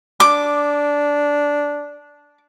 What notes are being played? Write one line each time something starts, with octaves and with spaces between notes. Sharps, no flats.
D4 D6